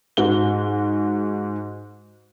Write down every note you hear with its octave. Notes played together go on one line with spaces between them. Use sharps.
G#2 F#4 G7